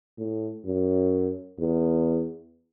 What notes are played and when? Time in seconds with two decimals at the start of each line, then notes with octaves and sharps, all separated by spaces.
0.18 A2
0.65 F#2
1.59 E2